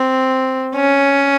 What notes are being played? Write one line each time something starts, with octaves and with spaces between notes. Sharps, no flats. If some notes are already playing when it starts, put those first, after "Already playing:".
Already playing: C4
C#4